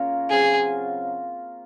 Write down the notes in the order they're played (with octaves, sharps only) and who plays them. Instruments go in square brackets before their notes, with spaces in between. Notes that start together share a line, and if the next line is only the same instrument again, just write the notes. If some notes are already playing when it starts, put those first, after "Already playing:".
Already playing: [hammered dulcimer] C#3 A#3 C#4 F4 A#4 C#5
[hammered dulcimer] C#3 F#3 C4 F4 [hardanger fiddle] G#4